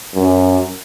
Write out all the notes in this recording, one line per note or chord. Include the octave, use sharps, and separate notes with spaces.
F#2